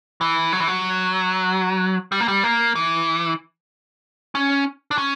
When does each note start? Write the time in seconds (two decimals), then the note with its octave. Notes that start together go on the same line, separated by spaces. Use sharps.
0.21 E3
0.53 F#3
0.60 E3
0.68 F#3
2.12 G3
2.20 A#3
2.28 G3
2.43 A#3
2.75 E3
4.35 C#4
4.91 D4
4.98 C#4